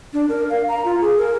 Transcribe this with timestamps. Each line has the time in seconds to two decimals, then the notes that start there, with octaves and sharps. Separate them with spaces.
0.13 D4
0.29 A#4
0.50 F5
0.68 A#5
0.85 F4
1.01 G#4
1.18 A#4